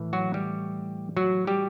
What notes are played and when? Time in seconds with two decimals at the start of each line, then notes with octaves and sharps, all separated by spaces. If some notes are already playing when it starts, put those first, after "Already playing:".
Already playing: A2 E3
0.13 F#3 F#4
0.34 G3 G4
1.17 F#3 F#4
1.47 G3 G4